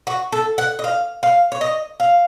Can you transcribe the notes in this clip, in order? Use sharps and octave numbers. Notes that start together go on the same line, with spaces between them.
F#4
A4
F#5
D#5
F5
F5
C#5
D#5
F5